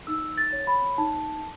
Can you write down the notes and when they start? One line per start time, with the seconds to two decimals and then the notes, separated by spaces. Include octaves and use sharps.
0.07 D#4 E6
0.38 A6
0.53 C#5
0.67 B5
0.98 D#4 A5